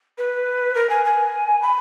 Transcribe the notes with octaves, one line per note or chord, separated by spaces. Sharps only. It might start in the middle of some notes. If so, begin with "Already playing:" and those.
B4
A#4
G#5
G#5
B5